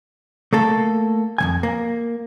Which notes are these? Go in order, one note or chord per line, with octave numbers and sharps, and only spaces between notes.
A3 A#3 A4
F2 E3 G#5
A#3